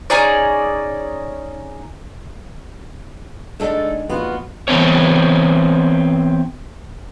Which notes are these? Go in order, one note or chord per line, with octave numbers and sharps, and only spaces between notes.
C#4 D#4 G#4 D5
G#3 A3 D4 D#4 A4
A#1 B3 F4 F#4
E3 B3 C4 C#5